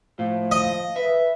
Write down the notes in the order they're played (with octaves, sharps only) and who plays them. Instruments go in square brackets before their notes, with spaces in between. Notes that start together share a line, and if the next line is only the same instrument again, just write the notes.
[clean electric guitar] A2 [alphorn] F3 [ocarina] F5
[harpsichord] D#5
[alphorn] B4 [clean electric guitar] E5